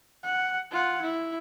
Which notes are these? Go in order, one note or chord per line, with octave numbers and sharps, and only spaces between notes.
F#5
F4 F#5
E4